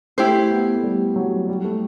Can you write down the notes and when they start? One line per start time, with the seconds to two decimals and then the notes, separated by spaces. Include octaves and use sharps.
0.18 A3 E4 G4 C5
0.51 B3
0.76 A3
0.84 G3
1.16 F#3
1.48 G3
1.64 A3